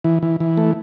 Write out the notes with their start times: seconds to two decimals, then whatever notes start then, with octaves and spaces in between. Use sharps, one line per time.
0.04 E3
0.23 E3
0.40 E3
0.57 A3